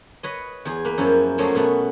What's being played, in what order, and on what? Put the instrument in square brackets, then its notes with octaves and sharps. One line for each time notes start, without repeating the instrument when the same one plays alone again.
[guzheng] B4 C#5 D#5
E2 G#4
A#3 B4
F#2 F3 C#4 E4
F3 F#3 A3 A#3 C#4 G#4
B2 A3 B3